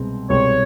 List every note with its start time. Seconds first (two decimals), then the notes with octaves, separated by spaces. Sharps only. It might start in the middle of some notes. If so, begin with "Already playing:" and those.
Already playing: C2 B2 G#3 C4
0.29 C2 B2 G#3 C4 C#5